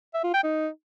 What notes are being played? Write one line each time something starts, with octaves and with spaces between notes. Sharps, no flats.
E5
F4
G5
D#4